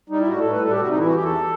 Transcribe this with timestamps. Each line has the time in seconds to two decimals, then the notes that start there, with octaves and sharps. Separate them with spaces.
0.10 G3 D#4
0.19 E4
0.27 A2 F#4
0.39 A4
0.45 A2
0.51 B4
0.63 G3 A4
0.71 G4
0.80 C3 F#4
0.89 D#4
0.97 E3 E4
1.06 F#4
1.15 E2 G4
1.24 A4